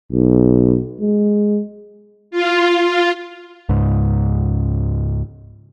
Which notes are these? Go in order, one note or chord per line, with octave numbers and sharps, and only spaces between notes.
B1
G#3
F4
F4
C#2 G#2